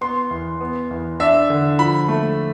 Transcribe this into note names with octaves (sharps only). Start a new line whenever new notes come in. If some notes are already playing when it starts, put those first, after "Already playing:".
B3 C6
E2
B3
E2
D4 E5
D3
F3 B5
A3